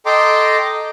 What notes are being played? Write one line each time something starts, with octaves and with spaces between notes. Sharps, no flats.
A4 D#5 G5 A#5 C6 D6